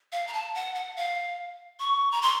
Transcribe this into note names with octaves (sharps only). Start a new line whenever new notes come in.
F5
A#5
A5
F#5
F#5
F5
C#6
A#5
C6